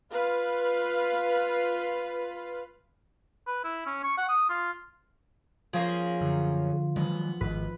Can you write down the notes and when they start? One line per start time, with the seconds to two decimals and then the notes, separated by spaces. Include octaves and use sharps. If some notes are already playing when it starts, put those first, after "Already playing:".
0.12 F4 B4 F5
3.47 B4
3.64 E4
3.86 C#4
4.04 C#6
4.18 F#5
4.29 D#6
4.50 F4
5.73 F3 A#3 C#4 G#4
6.21 F#2 D3
6.96 D#3 F#3 G#3 B3
7.41 G#1 G#2 D#3 B4